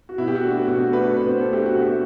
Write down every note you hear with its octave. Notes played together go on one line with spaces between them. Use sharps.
F#4
B2 E4
G4
F#4
A3 D4
F#4
B2 F#4
F#4
A3 D4 B4
A4
B2 B4
C5
A3 D4 A4
G4
B2 F#4
G4
A3